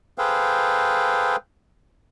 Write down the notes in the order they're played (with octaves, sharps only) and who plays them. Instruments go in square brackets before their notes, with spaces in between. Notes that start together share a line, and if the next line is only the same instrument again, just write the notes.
[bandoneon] G#4 A4 B4 C5 F5 G5